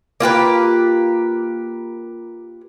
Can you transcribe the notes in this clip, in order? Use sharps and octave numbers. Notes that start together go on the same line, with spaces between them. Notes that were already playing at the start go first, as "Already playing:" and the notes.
A#3 F4 G4 B4